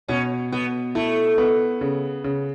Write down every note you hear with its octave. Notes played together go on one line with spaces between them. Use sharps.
B2 C#4
B2 B3
A3 E4
B3
C#3
C#3